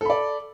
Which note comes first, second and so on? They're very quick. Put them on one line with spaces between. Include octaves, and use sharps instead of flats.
A4 B5 D5